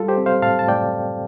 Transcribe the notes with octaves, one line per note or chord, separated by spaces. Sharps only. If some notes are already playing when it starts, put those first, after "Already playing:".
Already playing: G3 F4 A4
G4 C5
C4
C5 F5
A2 F5 A5
A5
A2 D5 G5